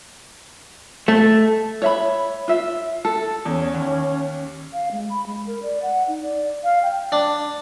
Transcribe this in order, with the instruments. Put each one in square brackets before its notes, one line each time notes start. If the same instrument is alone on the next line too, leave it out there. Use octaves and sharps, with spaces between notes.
[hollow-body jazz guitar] A3
[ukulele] C#5 E5 B5
F4 E5
A4
[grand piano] E2 [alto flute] C#4
[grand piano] D#2
[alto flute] F5
G#3
B5
G#3
A#4
D5
F#5
D#4
D5
F5
G5
[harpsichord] D4